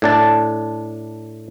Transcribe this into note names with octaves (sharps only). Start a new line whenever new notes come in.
A2 D4 A5